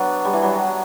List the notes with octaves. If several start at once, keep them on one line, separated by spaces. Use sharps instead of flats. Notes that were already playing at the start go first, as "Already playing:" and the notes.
Already playing: F#3 B3 D4
G3
E3
F#3